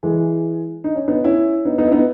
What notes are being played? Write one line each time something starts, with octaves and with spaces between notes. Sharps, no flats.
E3 G#3
D#4
C#4
B3 D#4
C#4 E4
B3 D#4
B3 D#4
E4
B3 D#4